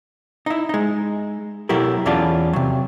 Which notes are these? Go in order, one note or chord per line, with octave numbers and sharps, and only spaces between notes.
D#4 E4
G#3 D#4
B2 F#3 E4 G4 A4 A#4
E2 E3 C#4 F4 D5 A5
C3 F#3